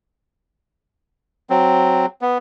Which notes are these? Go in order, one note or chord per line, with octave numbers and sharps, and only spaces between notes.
F#3 C4
B3